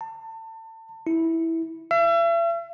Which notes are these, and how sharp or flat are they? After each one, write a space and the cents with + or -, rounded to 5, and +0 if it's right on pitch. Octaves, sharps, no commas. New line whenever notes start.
A5 +30
E4 -10
E5 +40